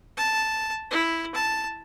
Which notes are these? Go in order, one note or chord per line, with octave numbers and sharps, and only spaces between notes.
A5
E4
A5